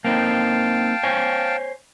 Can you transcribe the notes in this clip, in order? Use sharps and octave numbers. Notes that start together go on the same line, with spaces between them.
A#3 C4 D#4 F5 G5 A5
C5 C#5 G#5